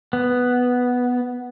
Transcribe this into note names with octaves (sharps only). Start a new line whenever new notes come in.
B3